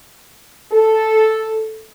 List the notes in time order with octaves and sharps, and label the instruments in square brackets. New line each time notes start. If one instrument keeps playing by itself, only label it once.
[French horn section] A4